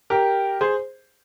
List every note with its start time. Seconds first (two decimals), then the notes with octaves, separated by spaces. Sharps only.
0.10 G4 A#4
0.61 G#4 C5